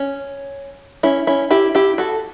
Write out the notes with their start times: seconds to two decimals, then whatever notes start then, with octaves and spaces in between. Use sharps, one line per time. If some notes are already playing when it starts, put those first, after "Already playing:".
Already playing: C#4
1.03 C#4 E4
1.27 C#4 E4
1.51 E4 G4
1.75 E4 G4
1.98 F#4 A4